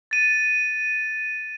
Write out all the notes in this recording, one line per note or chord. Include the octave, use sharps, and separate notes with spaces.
A6 D#7